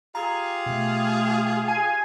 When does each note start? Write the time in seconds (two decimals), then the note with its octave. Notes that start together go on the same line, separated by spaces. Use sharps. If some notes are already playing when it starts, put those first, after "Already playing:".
0.15 F4 G4 G#4 A#5
0.66 B2 A3
1.68 G#5 C7